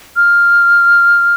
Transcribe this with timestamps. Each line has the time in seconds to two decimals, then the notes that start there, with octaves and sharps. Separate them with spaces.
0.16 F6